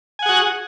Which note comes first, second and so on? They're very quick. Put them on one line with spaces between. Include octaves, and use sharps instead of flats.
G#5 F#5 G#4 F#4